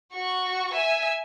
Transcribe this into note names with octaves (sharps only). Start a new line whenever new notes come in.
F#4 C#6
E5 G#5